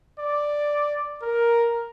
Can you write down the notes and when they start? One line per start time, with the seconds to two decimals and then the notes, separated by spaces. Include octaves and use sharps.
0.19 D5
1.22 A#4